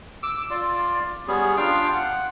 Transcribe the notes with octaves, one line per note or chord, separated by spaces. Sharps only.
D6 E6
F4 D5
G3 B3 C#4 G#4
D4 F4 F5 G5
F#5